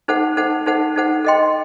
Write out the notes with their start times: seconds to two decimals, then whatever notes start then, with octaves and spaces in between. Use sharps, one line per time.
0.08 D#4 A4 C5 F#5
0.37 D#4 A4 C5 F#5
0.66 D#4 A4 C5 F#5
0.96 D#4 A4 C5 F#5
1.25 A4 D#5 G5 C6